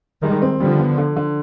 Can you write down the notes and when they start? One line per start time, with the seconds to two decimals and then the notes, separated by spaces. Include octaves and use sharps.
0.22 D#3 G3 G#3
0.42 C4
0.60 D3 F3 G3
0.79 B3
0.98 D3
1.17 D3